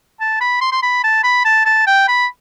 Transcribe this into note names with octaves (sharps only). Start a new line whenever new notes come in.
A5
B5
C6
C6
B5
A5
B5
A5
A5
G5
B5